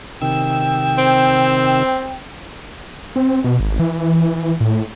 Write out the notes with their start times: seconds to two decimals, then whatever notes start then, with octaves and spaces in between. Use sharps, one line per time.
0.22 C3 D#3 G5 E6
0.98 C4
3.16 C4
3.44 B2
3.60 G#1
3.79 E3
4.61 A2